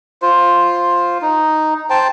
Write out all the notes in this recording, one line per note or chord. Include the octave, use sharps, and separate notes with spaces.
F4 C5
D#4
C5 G5 A5